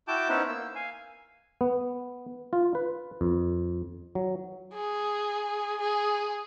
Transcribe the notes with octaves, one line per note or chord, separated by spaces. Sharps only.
E4 F#4 G5 A5 D6 G6
B3 C#4 D#4 E4 B4 C5
A#3 E6
F5 G#5
B3
F4
B4
F2
F#3
G#4
G#4